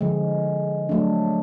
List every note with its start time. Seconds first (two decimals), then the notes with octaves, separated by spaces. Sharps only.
0.01 D3 F3 G#3
0.89 F#3 A3 D4